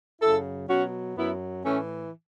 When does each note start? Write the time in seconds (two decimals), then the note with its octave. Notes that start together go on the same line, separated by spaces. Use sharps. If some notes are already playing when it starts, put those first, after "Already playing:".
0.21 F#2 C#3 F#3 E4 A4
0.69 B2 F#3 C#4 F#4
1.16 F#2 F#3 B3 E4
1.64 A2 E3 A3 C#4